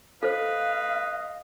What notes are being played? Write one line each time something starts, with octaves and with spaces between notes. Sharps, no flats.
A4 B4 C5 D#5 F5